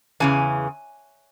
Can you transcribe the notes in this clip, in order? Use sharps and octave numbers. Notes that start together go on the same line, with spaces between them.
E2 C#3 E3 G#5